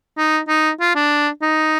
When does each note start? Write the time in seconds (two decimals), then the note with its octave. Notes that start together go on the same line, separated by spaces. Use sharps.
0.18 D#4
0.49 D#4
0.81 F4
0.96 D4
1.42 D#4